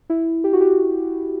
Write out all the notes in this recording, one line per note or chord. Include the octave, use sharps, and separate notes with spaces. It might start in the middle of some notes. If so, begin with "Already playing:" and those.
E4
G4
F#4
G4